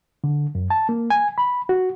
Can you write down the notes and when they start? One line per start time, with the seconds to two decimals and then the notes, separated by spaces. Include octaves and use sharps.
0.24 D3
0.55 F#2
0.70 A5
0.89 A#3
1.10 G#5
1.38 B5
1.69 F#4